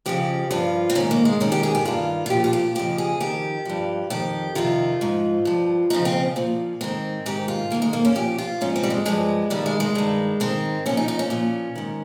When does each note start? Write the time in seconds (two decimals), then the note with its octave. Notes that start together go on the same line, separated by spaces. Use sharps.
0.06 F2 C#3 F3 G4
0.51 G2 F3 F4
0.90 C4
0.95 G#2 D#3 C#4
1.11 A#3
1.25 G#3
1.40 G#2 D#3 C#4
1.52 G4
1.63 G#4
1.75 G4
1.85 G2 D#3 F4
2.26 F4
2.30 A#2 F3 G4
2.44 F4
2.53 G4
2.75 F2 C#3 F3 G4
2.98 G#4
3.20 F2 D#3 G4
3.65 G2 F3
4.10 F2 D#3 G4
4.55 F2 C3 D#3 F4
5.01 G#2 F3
5.45 G2 F3
5.90 F2 C#3 F3 D#4
6.05 C4
6.36 A#2 F3
6.81 G#2 D#3 C4
7.26 G#2 D#3 G4
7.48 F4
7.70 G#2 D#3 A#3
7.82 G#3
7.93 A#3
8.05 C#4
8.15 A#2 F3 G4
8.38 F4
8.61 G#2 F3 C#4
8.76 C4
8.84 G3
8.90 G#3
9.05 G2 F3 G#3
9.50 G2 D#3 G3
9.66 G#3
9.80 G#3
9.95 G2 D#3
10.40 G#2 D#3 C4
10.86 A#2 F3 C#4
10.97 D#4
11.08 D#4
11.19 C#4
11.30 A#2 F3
11.75 G#2 D#3